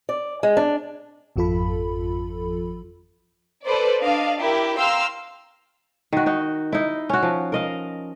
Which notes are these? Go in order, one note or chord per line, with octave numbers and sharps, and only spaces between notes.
D5
G#3
D4
G#1 F2 F3 F4 A4 B5
A4 B4 C5 D5
D4 D5 D#5 F5
E4 G4 A#4
F5 G5 A#5 C6 E6 F6
D#3 F#4
D#4 F#4
D#4 E4
C#4 F#4
F3
A#4 D#5 F5